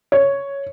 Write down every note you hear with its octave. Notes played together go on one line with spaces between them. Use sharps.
C#5